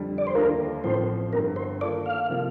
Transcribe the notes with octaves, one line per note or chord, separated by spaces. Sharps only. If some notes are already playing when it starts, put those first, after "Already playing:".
Already playing: F2 D3 G3
D5
C5
D#2 D3 A3 D4 F4 A#4
A1 A2 F3 C4 C5
G1 G2 D3 A#4
C5
D#3 A#3 F4 A4 D5
F5
C3 F3 A#3